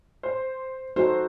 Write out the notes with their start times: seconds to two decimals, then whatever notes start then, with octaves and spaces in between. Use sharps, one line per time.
0.23 C5
0.96 D#4 F#4 A4 C5